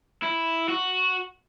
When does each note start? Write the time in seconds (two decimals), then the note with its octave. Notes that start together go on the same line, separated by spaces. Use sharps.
0.22 E4
0.69 F#4